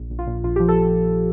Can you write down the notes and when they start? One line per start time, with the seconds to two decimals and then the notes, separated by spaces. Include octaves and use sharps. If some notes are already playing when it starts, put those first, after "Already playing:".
Already playing: A#1
0.10 A#1
0.19 F4
0.27 A#2
0.44 A#1 F4
0.56 G4
0.60 F3
0.68 A4